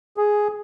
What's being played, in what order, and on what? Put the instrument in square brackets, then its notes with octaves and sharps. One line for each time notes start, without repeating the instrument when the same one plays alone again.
[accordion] G#4